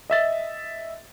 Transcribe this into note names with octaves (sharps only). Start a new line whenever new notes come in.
D#5 E5 A6